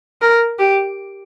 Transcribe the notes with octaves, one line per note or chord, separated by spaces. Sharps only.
A#4
G4